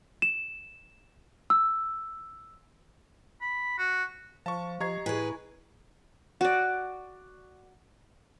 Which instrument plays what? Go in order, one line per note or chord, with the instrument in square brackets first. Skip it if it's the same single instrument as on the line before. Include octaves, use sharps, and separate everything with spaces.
[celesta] E7
E6
[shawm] B5
F#4
[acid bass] F3 [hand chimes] C5 F5 [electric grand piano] A5 C#6
[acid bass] F3 [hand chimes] G4 D#5 C7 [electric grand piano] A#5 C#6 G#6
[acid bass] A2 [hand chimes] E4 G#5 [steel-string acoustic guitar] G#4 B4
[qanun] F#4 D5